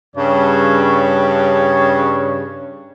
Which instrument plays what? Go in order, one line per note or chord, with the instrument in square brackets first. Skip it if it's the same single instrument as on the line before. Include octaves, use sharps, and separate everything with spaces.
[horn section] G2 C#3 C#5